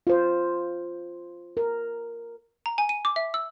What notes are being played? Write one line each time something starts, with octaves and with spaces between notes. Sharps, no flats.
F4 C5
A#4
A#5
G#5
D#7
D6
E5
E6